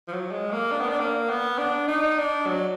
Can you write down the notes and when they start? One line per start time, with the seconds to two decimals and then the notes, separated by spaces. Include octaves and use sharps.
0.08 F3
0.12 F#3
0.32 G#3
0.52 A#3
0.71 D4
0.80 B3
0.89 D4
1.00 A#3
1.30 B3
1.58 D4
1.88 D#4
2.18 D4
2.46 F#3